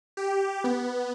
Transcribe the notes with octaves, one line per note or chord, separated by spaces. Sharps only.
G4
B3